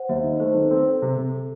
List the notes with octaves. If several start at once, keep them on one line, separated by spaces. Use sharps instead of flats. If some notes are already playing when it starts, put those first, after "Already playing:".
Already playing: C5 F#5
D#2 E5
D#3 D#5
A3 C5
D#3 B4
C4 A4
C4
C3
C3
A4